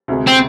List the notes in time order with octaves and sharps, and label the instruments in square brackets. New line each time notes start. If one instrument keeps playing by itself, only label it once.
[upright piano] D2 C3 G#3
[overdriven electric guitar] C4